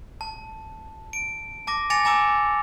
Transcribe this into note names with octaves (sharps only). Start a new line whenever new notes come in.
A5
D7
A5 D6 A#6
G#5 D6 A6 A#6 C#7 F7
G#5 A#5 D6 E6